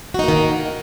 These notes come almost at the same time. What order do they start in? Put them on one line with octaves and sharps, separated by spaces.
F#4 D#4 A#3 D#3